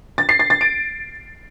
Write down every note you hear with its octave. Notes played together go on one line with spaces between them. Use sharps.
A6
C7
A6
A6
D7